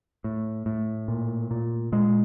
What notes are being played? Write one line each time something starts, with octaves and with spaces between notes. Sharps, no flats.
A2
A2
A#2
A#2
A#2 G#3